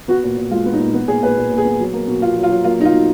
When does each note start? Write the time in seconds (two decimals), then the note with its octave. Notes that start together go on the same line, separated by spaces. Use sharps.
0.08 B3 F#4
0.24 A#2
0.37 A#2
0.51 G#3 F4
0.66 B3
0.73 D#4
0.80 A#2
0.94 B3
1.08 A#2 G#4
1.22 A#2 B4
1.37 A#2
1.50 A#2
1.58 G#4
1.65 B3
1.80 F#3
1.93 A#3
2.08 B2
2.22 B2 F4
2.36 F#3
2.43 F4
2.50 F#3
2.64 A#3 F4
2.79 B2 D#4
2.85 F4
2.93 B2